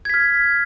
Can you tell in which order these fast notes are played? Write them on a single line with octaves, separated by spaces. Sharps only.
G#6 B6 F6